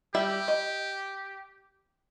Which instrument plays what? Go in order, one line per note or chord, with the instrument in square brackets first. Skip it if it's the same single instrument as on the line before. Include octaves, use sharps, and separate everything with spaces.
[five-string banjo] G3 E5 G5 [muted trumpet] G4
[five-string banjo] D#5